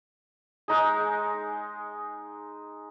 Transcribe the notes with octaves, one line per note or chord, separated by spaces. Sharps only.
G#3 D#4 G#4